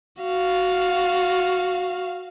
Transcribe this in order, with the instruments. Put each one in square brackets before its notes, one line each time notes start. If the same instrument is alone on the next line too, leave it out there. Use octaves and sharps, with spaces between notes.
[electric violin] F#4 F5